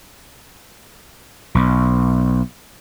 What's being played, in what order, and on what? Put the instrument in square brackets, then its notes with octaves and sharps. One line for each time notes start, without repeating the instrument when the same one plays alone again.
[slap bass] B1